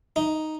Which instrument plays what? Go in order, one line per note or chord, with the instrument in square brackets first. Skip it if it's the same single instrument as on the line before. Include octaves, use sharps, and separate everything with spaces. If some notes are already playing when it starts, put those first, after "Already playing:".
[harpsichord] D#4